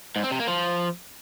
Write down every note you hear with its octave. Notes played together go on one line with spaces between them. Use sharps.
G#2
C4
C3
A#3
F3